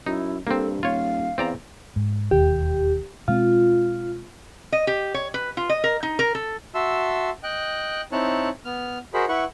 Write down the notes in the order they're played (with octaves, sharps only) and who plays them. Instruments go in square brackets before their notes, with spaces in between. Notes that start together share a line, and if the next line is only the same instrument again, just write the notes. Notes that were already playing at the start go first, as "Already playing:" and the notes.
[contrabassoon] F#2 [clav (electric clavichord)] D#4 [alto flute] E4
[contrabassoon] G2 [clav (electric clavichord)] A#3 C4 [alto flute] A4
[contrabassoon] D#1 [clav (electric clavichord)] F4 C#5 [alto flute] F5
[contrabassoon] E2 [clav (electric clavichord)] C4 D5 A#5
[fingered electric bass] G#2
[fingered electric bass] E1 D#2 [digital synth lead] G4
[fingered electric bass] B2 G#3 C4 [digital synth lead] F4
[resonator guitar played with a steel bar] D#5
G4
C#5
B4
F4
D#5
A#4
D#4
A#4
A4
[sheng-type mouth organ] F#4 E5 A5 C6 E6
D#5 G5 F#6
C4 D#4 E4 C#5 A5 F#6
B3 F6
F#4 G#4 A#4 C5 D#5 B5
E4 B4 F#5 C#6